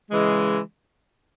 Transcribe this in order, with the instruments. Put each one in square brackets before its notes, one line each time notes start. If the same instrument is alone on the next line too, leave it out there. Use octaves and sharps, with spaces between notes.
[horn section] C#3 E3 G#3